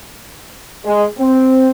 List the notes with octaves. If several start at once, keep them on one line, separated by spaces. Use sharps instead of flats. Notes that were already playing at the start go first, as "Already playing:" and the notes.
G#3
C4